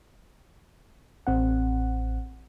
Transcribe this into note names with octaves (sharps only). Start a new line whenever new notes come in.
A1 C4 F#5